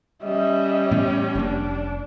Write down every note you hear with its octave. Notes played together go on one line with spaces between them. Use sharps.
G3 C#4 D#5 E5
A2 E3 B3
F1 A#3 D4